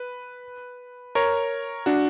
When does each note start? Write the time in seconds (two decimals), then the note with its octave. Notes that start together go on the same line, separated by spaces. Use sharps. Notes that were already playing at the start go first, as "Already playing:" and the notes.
Already playing: B4
1.15 A#4 C#5
1.86 D4 F#4